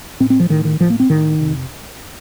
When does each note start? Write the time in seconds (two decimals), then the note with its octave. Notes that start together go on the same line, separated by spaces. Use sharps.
0.20 A2 C4
0.30 C4
0.40 F3
0.49 A2 D#3
0.65 D#3
0.80 A2 F3
0.90 A#3
1.00 C4
1.09 A2 D#3
1.40 F2 C3